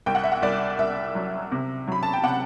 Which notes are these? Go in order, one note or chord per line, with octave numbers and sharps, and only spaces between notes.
C2 G5
F#5
E5
F#5
C2 D5
C2 E5
F#3
C3
F#3 B5
A5
G5
C3 F#5